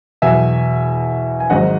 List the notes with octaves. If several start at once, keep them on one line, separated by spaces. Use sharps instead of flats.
E2 B2 F#3 E5 G#5
G#5
G#1 G#2 F#3 D#5 F#5